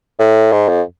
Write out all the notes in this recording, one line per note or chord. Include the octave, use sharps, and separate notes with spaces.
A2
G#2
F2